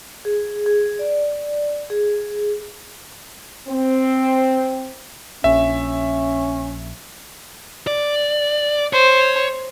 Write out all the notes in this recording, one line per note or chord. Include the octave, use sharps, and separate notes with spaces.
G#4
G#4
D5
G#4
C4
A#1 C#4 E5
D5
C5 C#5